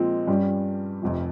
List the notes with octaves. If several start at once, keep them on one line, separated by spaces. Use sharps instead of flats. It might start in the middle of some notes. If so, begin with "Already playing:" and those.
Already playing: A#2 F3 G#3 C4
G2 G3 C#4
F1 F2 C3 F3